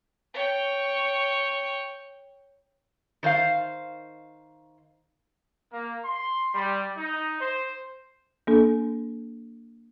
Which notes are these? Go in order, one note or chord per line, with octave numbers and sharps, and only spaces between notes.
C#5 G5
D#3 C5 D#5 F5
A#3
C6
G3
D#4
C5
A#3 D4 A4